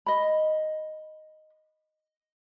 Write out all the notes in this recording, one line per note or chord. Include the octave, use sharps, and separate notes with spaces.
D#5 B5